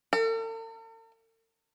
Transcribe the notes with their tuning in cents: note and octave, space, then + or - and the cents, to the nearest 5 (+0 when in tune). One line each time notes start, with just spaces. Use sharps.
A4 +45